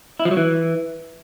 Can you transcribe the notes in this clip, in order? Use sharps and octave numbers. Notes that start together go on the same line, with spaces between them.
E4
F3
F#3
E3